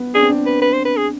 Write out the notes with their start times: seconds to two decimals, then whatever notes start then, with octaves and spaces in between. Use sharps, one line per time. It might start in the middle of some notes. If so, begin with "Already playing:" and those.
Already playing: B3
0.15 D4 G#4
0.22 C4
0.29 D4
0.46 B4
0.62 B4
0.73 C5
0.85 B4
0.97 G#4